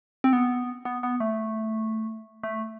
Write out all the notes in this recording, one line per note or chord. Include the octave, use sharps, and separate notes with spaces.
C4
B3
B3
B3
A3
A3